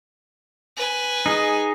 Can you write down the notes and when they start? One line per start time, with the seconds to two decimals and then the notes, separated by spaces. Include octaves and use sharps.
0.77 B4 G#5
1.26 D#4 G#4 D#5